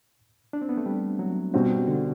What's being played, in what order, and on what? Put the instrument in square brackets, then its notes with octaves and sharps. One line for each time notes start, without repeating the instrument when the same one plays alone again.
[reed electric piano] D4
C4
B3
A3
G3
F#3
[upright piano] B2 G3 C4 F#4
[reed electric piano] D3